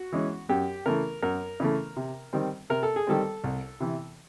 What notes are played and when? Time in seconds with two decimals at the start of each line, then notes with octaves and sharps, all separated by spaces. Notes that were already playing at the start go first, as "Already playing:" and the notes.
Already playing: F#4
0.12 E3 G#3 C#4
0.49 F#2 G4
0.86 C#3 E3 A3 A#4
1.22 F#2 A#4
1.60 C#3 E3 A3
1.97 C3
2.33 D#3 G3 C4
2.70 C3 A#4
2.83 A4
2.96 G#4
3.07 D#3 G3 C4 A4
3.44 C2
3.80 C3 E3